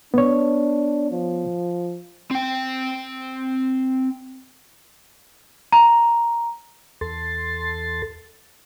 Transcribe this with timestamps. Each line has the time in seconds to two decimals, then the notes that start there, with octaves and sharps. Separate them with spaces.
0.14 B3 D4 C#5
1.11 F3
2.31 C4 G5
5.72 A#5
7.01 E2 A4 C6 A6